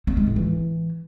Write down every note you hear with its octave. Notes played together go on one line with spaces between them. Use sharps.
C4
G#3
A2
E3